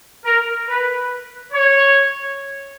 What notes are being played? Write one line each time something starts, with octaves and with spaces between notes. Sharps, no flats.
A#4
B4
C#5